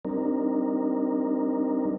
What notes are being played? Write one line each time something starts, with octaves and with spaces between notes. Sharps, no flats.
G3 C4 D4 D#4 A#4